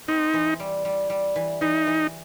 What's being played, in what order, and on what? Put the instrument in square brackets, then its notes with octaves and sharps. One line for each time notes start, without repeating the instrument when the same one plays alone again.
[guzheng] C4 [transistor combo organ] D#4
[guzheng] E3
G3
G3
G3
E3
[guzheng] E3 [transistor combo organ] D#4
[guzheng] E3